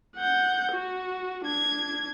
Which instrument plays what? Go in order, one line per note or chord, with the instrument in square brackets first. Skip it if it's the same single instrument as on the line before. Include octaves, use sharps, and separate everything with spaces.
[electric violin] F#5 G6
F#4
D4 G#6